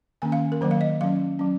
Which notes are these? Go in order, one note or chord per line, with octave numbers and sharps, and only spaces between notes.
D#3 A#3 C#4 G#5
F5
A#4
D#3 F#3 A#3 C5
F5
D#5
F#3 C#4 F5
F#3 C#4